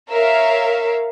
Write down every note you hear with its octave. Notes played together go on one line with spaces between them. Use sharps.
A#4 C#5 E5 F5